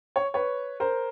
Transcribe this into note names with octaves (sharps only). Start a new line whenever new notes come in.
C#5
B4 C#5
A#4 C5